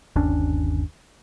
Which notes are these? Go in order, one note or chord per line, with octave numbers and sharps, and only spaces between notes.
G1 D#2 C#4 D4